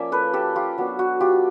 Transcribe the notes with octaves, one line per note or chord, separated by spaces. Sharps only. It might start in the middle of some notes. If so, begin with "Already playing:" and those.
Already playing: F3 A#3 C#4 D5 E5
A4 B4
G4 A4
F4 G4
F#3 B3 D4
F#4
F4 G4